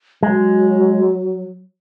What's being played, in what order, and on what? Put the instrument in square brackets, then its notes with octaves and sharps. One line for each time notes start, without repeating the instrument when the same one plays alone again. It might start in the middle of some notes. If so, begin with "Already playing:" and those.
[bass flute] F#3 [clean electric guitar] G#3